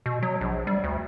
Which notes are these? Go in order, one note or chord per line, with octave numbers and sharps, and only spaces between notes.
B2
F#3
A#1
G3
D2